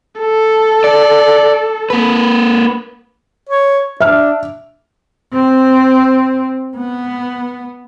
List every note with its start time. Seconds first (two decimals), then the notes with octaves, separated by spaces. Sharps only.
0.20 A4
0.84 D5
1.90 A#3 B4
3.49 C#5
4.00 D4 E5 F6
5.33 C4
6.76 B3